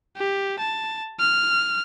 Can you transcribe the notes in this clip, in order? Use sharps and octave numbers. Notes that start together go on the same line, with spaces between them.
G4
A5
F6